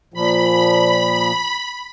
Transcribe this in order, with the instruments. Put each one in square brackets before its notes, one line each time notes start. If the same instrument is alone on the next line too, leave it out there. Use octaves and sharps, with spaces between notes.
[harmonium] A#2 F3 [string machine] B5